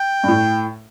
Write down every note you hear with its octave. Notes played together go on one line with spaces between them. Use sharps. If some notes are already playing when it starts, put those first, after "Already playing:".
Already playing: G5
G2
A2